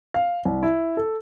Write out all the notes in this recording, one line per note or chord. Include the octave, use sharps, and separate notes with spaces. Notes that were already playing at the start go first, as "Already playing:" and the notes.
F5
C2
E4
A4